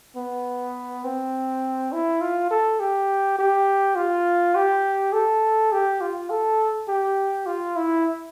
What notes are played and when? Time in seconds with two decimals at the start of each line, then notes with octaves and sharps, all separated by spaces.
0.16 B3
1.04 C4
1.92 E4
2.21 F4
2.51 A4
2.80 G4
3.39 G4
3.96 F4
4.55 G4
5.13 A4
5.72 G4
6.01 F4
6.30 A4
6.88 G4
7.47 F4
7.76 E4